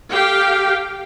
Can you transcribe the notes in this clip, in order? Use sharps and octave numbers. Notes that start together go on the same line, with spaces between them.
G4 A4 F5 G5